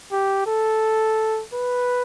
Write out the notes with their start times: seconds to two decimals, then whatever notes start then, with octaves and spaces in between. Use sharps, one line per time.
0.12 G4
0.47 A4
1.54 B4